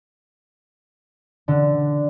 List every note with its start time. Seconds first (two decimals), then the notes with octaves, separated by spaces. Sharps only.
1.48 D3